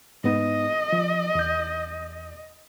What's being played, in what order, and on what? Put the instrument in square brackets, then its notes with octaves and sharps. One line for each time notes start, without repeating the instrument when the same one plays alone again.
[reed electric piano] G#2 B3 D#4 [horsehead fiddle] D#5
[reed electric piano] F3
E2 G6